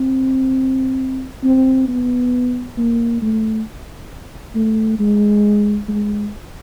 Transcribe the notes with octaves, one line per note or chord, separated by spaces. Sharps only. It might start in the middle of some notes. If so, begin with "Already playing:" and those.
Already playing: C4
C4
B3
A#3
A3
A3
G#3
G#3